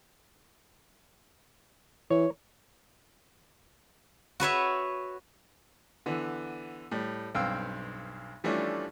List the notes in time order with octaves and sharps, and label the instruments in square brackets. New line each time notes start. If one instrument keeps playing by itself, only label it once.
[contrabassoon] E3 [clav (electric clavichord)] C#5
[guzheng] F#4 B4 C#5 E5
[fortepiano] D3 E3 B3
A2 G3
B1 G2 C4 F5 G5 E6
E3 F3 G3 A3 C#4 D4